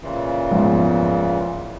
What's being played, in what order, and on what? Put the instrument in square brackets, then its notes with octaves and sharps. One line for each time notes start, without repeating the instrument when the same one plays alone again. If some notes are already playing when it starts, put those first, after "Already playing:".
[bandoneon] A#2 C#3 E3
[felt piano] E2 G#2 F3